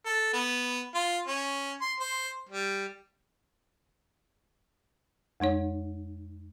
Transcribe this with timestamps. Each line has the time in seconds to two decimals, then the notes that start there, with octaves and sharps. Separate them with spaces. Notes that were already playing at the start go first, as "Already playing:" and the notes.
0.06 A4
0.33 B3
0.94 F4
1.27 C#4
1.81 C6
2.00 C5
2.49 G3
5.40 F2 G#3 D#4 C#5